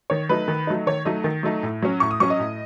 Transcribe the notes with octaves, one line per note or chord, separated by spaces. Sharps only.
D#3 C#5
F#3 A3 D#4 B4
D#3
F#3 A3 D#4
D#3 C#5
F#3 A3 D#4 D#5
D#3
F#3 A3 D#4
A2
F#3 C#4
A2 C#6
D#6
F#3 C#4 C#6
D#5
A2